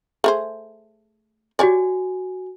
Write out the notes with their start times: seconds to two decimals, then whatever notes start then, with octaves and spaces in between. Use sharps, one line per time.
0.24 A3 G#4 C5
1.59 F#4 G4 C#5 D5 G#5